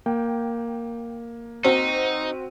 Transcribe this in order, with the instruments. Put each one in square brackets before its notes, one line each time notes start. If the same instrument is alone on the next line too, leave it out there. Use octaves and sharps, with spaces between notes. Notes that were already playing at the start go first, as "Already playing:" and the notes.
[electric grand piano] A#3 [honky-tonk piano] G5
[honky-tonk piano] C4 F#4 [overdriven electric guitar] D#4 [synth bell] C5 D#7